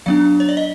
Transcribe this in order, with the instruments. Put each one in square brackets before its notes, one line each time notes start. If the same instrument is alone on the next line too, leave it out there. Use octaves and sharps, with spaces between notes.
[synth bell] F#3 B3 D4 F5
C#5
D5
D#5